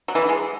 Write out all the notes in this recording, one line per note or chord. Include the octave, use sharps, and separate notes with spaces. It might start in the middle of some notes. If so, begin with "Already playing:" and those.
F#3
E3
D3
G#3